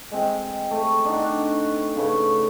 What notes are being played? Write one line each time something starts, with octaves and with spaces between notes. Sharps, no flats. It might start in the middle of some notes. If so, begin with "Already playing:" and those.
G#3 C4
A3
D4 D#4 F#4
C#3 A3 B4 C#5